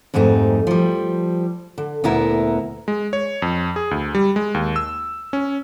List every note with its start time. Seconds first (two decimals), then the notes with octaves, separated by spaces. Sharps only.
0.14 F2 G#2 G3 A3 D#4
0.67 F3 G3
1.78 D3
2.04 D2 A#2 B3 E4 A#4 E5
2.88 G#3
3.13 C#5
3.42 F2
3.76 G#4
3.91 D2
4.15 G3
4.36 G#3
4.54 D#2
4.76 E6
5.33 C#4